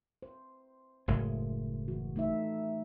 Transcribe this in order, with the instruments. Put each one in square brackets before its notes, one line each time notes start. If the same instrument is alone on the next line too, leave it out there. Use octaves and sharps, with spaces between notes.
[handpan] C5
[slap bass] F#1 A2 G#3
[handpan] E3 F#4
A3 D#4 E5